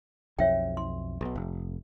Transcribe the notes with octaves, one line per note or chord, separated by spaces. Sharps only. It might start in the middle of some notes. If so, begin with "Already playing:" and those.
B1 F2 C#5 E5 G5
C6
B1 B2
F1